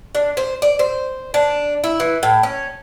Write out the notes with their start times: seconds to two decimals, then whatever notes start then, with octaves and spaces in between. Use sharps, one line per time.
0.15 D4
0.37 C5
0.62 D5
0.79 C5
1.34 D4
1.84 E4
2.00 E3
2.23 A2
2.43 C#4